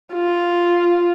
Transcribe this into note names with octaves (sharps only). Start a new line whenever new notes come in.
F4